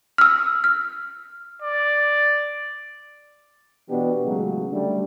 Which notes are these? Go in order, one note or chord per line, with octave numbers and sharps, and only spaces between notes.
E6 F6
F6
D5
B2 E3 B3 D4 G4
A1 C#3 F#3 G#3
D3 G3 A3 D4